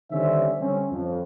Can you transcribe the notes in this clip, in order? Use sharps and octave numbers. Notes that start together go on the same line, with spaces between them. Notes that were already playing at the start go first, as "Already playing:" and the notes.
D3 D#3 G3 C4 C#4 E5
D3 G3 C4 C#4
F2